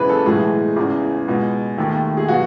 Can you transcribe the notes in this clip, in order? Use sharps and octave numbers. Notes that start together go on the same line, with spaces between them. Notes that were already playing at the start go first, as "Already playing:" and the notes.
Already playing: F#1 E2 C#3 E3 G#4 B4
A4
B1 A2 E3 G#3 G#4
E2 C#3 E3
C#2 B2 G#3
D#2 D#3 A3
G#4
B2 F#3 F#4